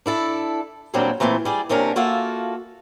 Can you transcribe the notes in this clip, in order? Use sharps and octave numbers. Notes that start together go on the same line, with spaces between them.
D4 E4 A4
D#2 A#2 F#3 G3 C4 D4
A#2 E3 A3 A#3 C4
G3 G#4 D5
D#2 C3 C#4 D4 A#4
A#3 F4 F#4 A4 E5 F5